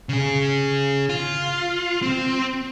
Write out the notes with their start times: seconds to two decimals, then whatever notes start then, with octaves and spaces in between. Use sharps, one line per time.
0.09 C#3 G#4
1.09 F4
2.02 C4